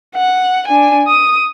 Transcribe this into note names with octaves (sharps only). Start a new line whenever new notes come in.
F#5
D4 G#5
D#6